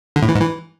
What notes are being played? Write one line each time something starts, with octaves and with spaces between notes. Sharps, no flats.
D3
A2
E3
G#2
E3